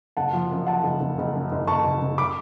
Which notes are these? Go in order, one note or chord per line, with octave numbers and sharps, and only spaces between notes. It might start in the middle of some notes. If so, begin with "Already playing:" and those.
F#1 F#5 A5
F3
F#2
F3 F#5 A5
F#1
F#1
F#1
F#2
F#1
F#1 A5 C#6
F#1
F#1
B5 D6